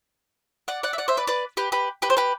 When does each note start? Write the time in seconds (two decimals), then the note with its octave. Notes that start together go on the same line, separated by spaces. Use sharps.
0.68 D5 F#5
0.83 D5 F#5
0.93 E5
0.98 D5 F#5
1.08 C5 E5
1.17 B4 D5
1.27 B4 D5
1.57 G4 B4
1.72 G4 B4
2.02 G4 B4
2.10 C5
2.17 G4 B4